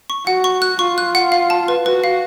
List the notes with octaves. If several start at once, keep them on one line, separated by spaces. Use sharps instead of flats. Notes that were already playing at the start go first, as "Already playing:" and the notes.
C#6
F#4 F#5
C#6
F#6
F4 C#6
F#6
F#5
F5
A5
B4
F#4 B4
F5